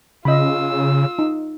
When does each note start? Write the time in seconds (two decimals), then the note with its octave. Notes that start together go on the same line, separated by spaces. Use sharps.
0.25 C#3 F4 D#5 B5 E6
1.19 D#4